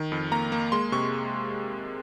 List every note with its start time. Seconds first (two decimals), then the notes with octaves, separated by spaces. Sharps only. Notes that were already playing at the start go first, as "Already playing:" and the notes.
Already playing: D#3
0.12 F2
0.31 A#3 A#5
0.52 A#3
0.72 G#3 C6
0.92 C3 C#6